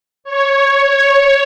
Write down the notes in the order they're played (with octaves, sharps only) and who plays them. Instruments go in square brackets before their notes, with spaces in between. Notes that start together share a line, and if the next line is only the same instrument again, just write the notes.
[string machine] C#5